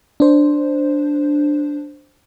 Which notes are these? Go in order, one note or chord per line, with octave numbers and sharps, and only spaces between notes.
D4 C5